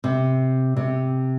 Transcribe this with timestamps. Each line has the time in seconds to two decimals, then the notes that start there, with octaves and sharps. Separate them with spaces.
0.04 C3
0.77 C3